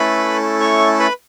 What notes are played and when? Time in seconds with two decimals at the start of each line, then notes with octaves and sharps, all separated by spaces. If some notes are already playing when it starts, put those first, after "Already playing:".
Already playing: A3 C#4 E4 A4 B4 B5
0.60 C#5 C#6
0.99 B4 B5